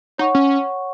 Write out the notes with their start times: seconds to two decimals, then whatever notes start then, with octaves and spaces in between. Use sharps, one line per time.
0.18 D#4 C#5 F#5 C#6
0.35 C#4